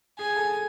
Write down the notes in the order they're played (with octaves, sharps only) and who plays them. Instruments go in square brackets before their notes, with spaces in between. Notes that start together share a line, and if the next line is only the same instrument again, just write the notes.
[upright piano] G#4 [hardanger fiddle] G#5
[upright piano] G#4
A4